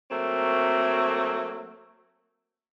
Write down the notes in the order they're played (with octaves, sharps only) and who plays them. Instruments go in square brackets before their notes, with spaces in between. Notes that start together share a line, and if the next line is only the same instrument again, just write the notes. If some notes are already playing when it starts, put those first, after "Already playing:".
[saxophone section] F#3 A3 A#3 C4